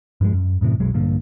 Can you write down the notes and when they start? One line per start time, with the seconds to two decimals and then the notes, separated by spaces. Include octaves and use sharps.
0.21 G2 F3 G#3
0.33 F#2
0.61 F#2 A2 C3 E3
0.80 B1 F#2 F#3 G#3
0.94 A#1 G2 D3 A#3